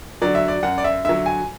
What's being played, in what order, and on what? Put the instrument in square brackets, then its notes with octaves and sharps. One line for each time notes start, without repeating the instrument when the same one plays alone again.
[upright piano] D3 F#3 D5
E5
D5
F#2 F#5
D5
E5
D3 F#3 E5
G#5